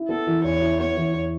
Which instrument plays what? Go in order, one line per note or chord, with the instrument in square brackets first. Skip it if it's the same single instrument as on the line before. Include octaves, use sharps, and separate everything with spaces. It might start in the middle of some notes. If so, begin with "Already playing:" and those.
Already playing: [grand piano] E4
[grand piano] B3 [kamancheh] A4
[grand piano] E3
[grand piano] E2 [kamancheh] C#5
[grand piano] E4
[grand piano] B3 [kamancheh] C#5
[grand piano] E3
E2